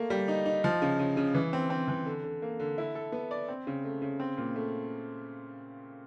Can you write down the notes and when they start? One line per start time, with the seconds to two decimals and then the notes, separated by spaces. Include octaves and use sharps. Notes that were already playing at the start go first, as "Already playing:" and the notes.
Already playing: A3 A#3
0.10 G3
0.28 D#4
0.46 D#4
0.64 F3
0.82 C#3
0.99 C#3
1.17 C#3
1.35 E3
1.53 C4
1.70 C4
1.88 E3
2.06 D3
2.24 D3
2.42 A#3
2.60 D3
2.78 E4
2.95 A4
3.12 B3
3.31 D5
3.49 C4
3.67 C#3
3.85 A3
4.02 C#3
4.20 C4
4.38 A#2
4.56 A3